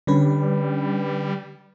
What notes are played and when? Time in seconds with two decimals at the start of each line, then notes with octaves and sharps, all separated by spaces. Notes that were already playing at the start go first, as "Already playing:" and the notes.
0.07 D3 G3 C#4 B4